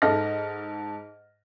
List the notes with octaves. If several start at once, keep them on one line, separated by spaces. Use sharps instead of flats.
G#2 A4 D#5 F6 A#6